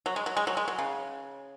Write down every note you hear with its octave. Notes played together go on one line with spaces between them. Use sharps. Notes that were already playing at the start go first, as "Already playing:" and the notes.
F#3
G#3
F#3
G#3
F#3
G#3
F#3
C#3